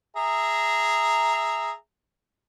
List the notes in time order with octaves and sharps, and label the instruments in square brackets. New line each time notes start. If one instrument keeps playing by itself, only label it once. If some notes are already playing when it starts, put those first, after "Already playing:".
[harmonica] G#4 E5 A#5